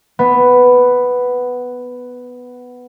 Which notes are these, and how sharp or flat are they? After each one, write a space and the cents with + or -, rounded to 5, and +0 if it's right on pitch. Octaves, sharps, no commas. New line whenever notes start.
B3 +5